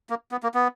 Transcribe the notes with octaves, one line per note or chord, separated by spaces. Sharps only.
A#3
B3
A#3
B3